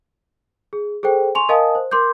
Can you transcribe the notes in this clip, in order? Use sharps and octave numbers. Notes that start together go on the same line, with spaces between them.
G#4
G#4 A4 C5 G5
G#5 C6 C#6 F7
A#4 D#5 F5 G#5 A5 D#6
C5
A#4 C6 D6 G6